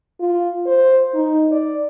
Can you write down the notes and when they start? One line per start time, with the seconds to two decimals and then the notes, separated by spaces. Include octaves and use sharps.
0.20 F4
0.66 C5
1.14 D#4
1.52 D5